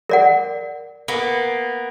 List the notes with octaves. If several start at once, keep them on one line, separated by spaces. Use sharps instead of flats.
A#4 D5 F#5
A#3 B3